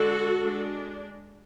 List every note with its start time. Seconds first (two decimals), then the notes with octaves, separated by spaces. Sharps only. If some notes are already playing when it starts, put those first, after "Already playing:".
Already playing: D3 G#3 D4 F#4 A4
0.42 G#3 D4